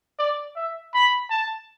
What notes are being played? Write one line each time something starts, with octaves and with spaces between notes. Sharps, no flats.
D5
E5
B5
A5